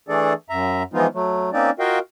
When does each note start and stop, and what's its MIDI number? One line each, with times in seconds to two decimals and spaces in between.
0.09 0.33 52
0.09 0.33 57
0.09 0.33 62
0.09 0.33 68
0.09 0.33 69
0.09 0.33 74
0.50 0.83 42
0.50 0.83 76
0.50 0.83 82
0.93 1.07 52
0.93 1.07 53
0.93 1.07 56
0.93 1.07 59
0.93 1.07 63
0.93 1.07 65
1.14 1.50 54
1.14 1.50 57
1.53 1.70 58
1.53 1.70 60
1.53 1.70 61
1.53 1.70 63
1.53 1.70 74
1.79 1.99 65
1.79 1.99 66
1.79 1.99 70
1.79 1.99 75
1.79 1.99 77
1.79 1.99 79